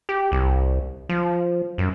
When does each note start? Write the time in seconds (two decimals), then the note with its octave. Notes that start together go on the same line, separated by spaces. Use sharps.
0.09 G4
0.32 C2
1.09 F3
1.78 F#2